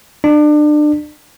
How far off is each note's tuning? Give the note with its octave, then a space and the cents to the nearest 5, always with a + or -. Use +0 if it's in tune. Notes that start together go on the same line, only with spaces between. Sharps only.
D4 +30